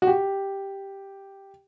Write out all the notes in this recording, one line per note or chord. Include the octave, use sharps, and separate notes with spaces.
F#4
G4